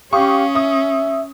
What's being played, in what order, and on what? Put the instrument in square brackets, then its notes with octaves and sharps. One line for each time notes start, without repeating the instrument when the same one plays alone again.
[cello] C#4 [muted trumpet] G4 [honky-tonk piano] F5 C#6 D#6
[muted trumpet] E5 [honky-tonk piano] D#6